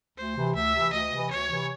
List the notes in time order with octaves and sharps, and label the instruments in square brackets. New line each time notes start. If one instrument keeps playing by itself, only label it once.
[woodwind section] D2 [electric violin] C5
[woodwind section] C3 E3
[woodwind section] D2 [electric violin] E5
[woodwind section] C3 E3
[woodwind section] D2 [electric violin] D#5
[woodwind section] C3 E3
[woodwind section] D2 [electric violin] C#5
[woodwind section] C3 E3